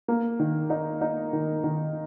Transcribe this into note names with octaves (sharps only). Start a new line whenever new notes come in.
A#3
D#3
D#4
D#4
D#3
D#3